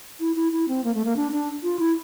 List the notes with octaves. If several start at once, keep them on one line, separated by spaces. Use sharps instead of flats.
E4
E4
E4
C4
A#3
A3
A#3
D4
D4
F4
E4